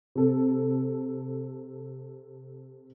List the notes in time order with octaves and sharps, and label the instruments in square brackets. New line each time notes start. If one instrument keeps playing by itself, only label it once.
[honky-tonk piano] C3 A4